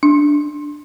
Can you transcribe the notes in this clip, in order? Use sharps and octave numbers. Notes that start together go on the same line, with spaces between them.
D4